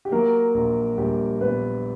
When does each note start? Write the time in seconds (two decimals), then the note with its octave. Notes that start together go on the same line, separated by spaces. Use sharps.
0.05 G4
0.11 F#3 A#3 A#4
0.54 A#1
0.98 A#1 G3 G4
1.41 A#2 B3 B4